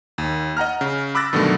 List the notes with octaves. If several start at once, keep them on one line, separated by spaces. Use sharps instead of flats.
D#2
D#5 F#5 A#5 F6
C#3
B5 D6 E6 F#6 A6 A#6
G2 B2 D3 D#3 F#3 A3